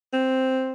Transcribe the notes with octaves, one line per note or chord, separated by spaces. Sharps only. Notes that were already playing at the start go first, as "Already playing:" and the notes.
C4